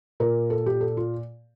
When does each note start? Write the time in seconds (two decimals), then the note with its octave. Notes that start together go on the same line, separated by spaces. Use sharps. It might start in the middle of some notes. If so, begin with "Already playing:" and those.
0.20 A#2 A#4
0.50 A4
0.66 G4
0.81 A4
0.97 F4